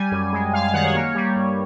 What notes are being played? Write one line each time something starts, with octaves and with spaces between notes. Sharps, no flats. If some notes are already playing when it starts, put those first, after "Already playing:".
Already playing: G3 G#5
F#2
G#3
F#2 F5
F5
D#3 F#5
C#5
A#3
G3
G2